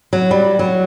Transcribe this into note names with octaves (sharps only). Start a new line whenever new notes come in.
F#3
G3
F#3